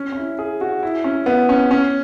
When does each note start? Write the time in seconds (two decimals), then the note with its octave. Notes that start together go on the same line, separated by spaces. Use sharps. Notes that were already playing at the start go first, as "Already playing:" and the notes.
Already playing: C#4
0.12 C#4
0.17 E4
0.39 G#4
0.61 F#4
0.83 E4
1.04 C#4
1.26 B3
1.49 C#4
1.71 C#4